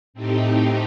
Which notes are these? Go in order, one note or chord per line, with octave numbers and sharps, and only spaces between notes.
A2 A3 C4 D#4 G4